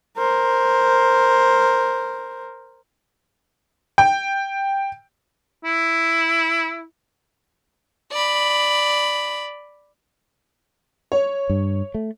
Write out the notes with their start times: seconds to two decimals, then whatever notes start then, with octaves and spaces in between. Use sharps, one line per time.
0.17 A#4 C5
3.98 G5
5.65 E4
8.12 D5 B5
11.12 C#5
11.50 G2
11.94 A3